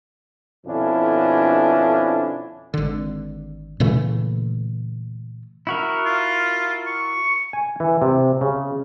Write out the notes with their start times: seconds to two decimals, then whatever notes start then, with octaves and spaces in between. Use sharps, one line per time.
0.66 F2 B2 D3 C#4 D4 E4
2.74 G#1 D3
3.80 A#2 C#3 E3 A3
5.67 E4 F#4 A#4
6.05 F4
6.87 C#6
7.53 G#5
7.80 E3
8.02 C3
8.41 C#3